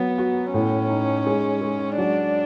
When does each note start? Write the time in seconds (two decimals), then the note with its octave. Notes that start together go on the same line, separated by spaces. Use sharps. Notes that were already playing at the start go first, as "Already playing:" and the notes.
Already playing: F#3 B3
0.18 F#4
0.53 A2 C#4
0.89 D#4
1.26 G#3
1.61 G#3
1.98 F#3 D4